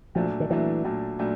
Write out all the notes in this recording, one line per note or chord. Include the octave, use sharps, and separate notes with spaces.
A#2 F3 F#3 A3 D4
D#3
A#2 E3 F#3 A3 D4
A#2 F#3 A3 D4
A#2 F#3 A3 D4